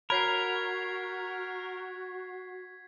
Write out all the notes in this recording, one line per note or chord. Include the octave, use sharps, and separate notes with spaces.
F#4 A#4 C#5 B5 G#6 B6 C7